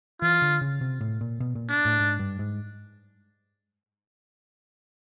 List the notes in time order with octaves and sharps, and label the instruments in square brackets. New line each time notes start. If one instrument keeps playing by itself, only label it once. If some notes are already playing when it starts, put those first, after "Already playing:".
[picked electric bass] E3 [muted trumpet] F4
[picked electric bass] D3
C#3
C3
A2
A#2
B2
A#2
[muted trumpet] D4
[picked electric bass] A2
G#2
G2
G#2